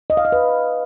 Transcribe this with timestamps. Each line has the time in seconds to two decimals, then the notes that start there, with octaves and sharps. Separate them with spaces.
0.10 D#5
0.17 F5
0.25 D#5
0.32 B4